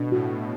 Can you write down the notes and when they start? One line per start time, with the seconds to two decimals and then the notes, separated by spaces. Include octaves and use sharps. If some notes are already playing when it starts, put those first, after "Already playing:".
Already playing: B2 D4
0.12 A2 F#4